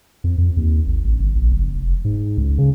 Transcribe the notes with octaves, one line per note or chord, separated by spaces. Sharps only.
F2
F2
D#2
G#1
A1
G1
A#1
F#1
F1
G#2
C#2
C#3